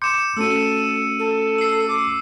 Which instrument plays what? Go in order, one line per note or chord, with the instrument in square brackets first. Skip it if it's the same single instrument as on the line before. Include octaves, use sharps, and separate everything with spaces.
[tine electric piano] C6 D6 G6 [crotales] C#7 E7
[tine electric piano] A3 C#4 F#4 [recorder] A4 [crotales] E6 D#7
[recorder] A4
[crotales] E6 C7
[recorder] D6